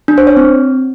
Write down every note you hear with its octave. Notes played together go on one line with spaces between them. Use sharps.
D4
C5
C#5
C4